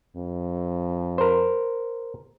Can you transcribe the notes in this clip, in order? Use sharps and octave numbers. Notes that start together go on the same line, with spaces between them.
F2
A#4 C5